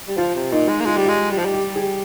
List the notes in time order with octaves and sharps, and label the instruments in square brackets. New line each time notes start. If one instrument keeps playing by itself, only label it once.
[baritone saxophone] G3
[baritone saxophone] F3 [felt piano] F4
[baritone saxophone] C3
[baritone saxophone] A#2 [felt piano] D#4
[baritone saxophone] G#3
A#3
[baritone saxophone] G#3 [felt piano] F4
[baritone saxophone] G3 [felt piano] G4
[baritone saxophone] G#3 [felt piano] F4
[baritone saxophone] G3
F3
G3
[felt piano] G4
G#4